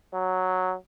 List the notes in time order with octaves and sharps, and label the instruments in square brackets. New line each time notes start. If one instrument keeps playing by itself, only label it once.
[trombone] F#3